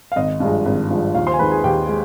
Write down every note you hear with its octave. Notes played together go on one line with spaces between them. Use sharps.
F5
G#1 D#5
G2 F3 G#3
G#1
G2 F3 G#3
D#2 F4 F5
C5 C6
G#5
D#3 G#3 B4 B5
G#4 G#5
D#2 G4 G5
G#3